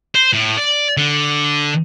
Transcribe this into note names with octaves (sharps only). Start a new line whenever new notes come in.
C5
A2
D5
D3